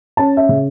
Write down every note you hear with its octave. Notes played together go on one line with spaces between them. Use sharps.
C#4 A5
E5
C#3